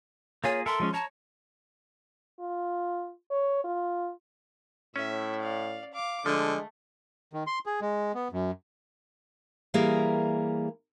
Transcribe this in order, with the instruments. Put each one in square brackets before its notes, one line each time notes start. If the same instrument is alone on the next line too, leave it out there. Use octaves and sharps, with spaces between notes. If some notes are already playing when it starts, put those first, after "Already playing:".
[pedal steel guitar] A#3 F4 G#4 [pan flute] C#5
[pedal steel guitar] A4 A#4 E5 [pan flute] C6
[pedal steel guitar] F3 G#3 C#4
[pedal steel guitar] C#5 A#5 [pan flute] A5
[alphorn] F4
C#5
F4
[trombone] A2 [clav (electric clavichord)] C#4 [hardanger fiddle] E5
[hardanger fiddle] D5 F5
F5 D6
[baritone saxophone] D3 [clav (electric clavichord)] F3 [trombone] G#3 [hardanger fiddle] A3
[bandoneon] D#3
C6
G#4
G#3
B3
F#2
[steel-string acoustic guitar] E3 G3 A#3 G#4 A#4